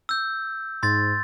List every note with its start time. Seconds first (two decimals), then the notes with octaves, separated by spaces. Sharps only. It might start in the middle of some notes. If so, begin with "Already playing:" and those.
0.09 E6 G6
0.83 G#2 C6 A6